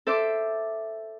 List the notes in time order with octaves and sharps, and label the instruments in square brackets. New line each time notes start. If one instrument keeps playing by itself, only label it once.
[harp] A4 C5 E5 D6